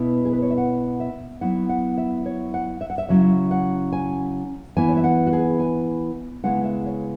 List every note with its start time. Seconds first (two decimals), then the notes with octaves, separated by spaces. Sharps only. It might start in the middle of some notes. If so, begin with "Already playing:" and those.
Already playing: B2 B3 E4
0.25 G#4
0.33 B4
0.42 C#5
0.50 E5
0.58 F#5
1.00 E5
1.41 F#3 B3 E4 F#5
1.69 F#5
1.98 E5
2.26 C#5
2.54 F#5
2.81 E5
2.90 F#5
2.98 E5
3.09 C#3 F#3 C#4 E4 E5
3.51 F#5
3.93 G#5
4.76 E3 B3 E4 G#5
4.89 C#5
4.97 E5
5.04 F#5
5.27 F#4
5.33 G#4
5.59 G#5
6.44 C#3 G#3 B3 E4 F#5
6.64 E5
6.86 C#5